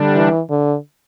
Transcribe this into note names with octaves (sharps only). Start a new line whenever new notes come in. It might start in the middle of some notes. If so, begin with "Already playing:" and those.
Already playing: D3 G3 D4
E3
D3